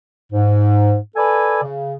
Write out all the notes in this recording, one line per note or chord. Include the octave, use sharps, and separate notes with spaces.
G#2
A4 B4 D5 G#5
C#3